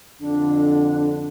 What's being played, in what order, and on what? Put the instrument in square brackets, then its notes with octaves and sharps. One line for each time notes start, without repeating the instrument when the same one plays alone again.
[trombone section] F2 D3 [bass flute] D4